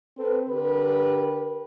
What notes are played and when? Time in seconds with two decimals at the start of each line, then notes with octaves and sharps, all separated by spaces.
0.17 C4 A4 B4 C5
0.49 D3 G4 A#4 B4